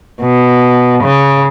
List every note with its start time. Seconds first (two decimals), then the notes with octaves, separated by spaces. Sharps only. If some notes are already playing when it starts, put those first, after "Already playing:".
0.22 B2
1.03 C#3